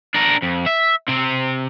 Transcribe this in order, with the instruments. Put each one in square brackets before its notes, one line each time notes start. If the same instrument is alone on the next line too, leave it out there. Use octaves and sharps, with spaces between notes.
[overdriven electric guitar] D4 A#4
F2
E5
C3 C4